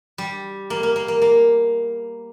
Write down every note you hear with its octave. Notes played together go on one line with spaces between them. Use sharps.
G3
A#3
A#3
A#3
A#3
A#3